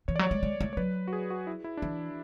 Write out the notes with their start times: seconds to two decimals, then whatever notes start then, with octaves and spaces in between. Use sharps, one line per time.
0.08 E3 C#5
0.16 D5
0.19 F#3
0.23 C#5
0.31 G#3
0.43 G#3
0.61 A3
0.73 C#5
0.77 F#3 B4
1.08 F#4
1.13 G#4
1.30 F#4
1.47 E4
1.64 E4
1.77 D4
1.82 E3 E4